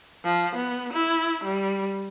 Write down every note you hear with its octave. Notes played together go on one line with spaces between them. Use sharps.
F3
B3
E4
G3